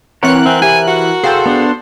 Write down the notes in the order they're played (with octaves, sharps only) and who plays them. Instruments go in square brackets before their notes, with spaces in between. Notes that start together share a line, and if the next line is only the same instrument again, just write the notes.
[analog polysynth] E3 F#6 [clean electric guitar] C4 C6 [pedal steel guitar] A#4 F#5 [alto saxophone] C#5
[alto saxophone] C4 [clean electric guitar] E4 G#5
[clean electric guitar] G4 C5 E5 [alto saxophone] G#5
[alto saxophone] F#4
[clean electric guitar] G#4 F5 G5 [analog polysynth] A4 C5
[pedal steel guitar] B3 D4